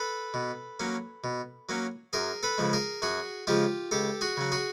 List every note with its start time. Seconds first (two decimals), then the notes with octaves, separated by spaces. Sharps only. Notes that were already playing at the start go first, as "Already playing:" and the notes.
Already playing: A4 B4
0.34 B2
0.80 F#3 A#3 C#4
1.24 B2
1.69 F#3 A#3 C#4
2.13 F#2 G#4 A#4
2.43 A4 B4
2.58 C#3 F3 G#3
2.73 G#4 A#4
3.02 F#2 F#4 G#4
3.47 C#3 F3 G#3 F4 G4
3.91 C#2 G4 A4
4.21 F#4 G#4
4.37 C#3 F#3
4.52 F#4 G#4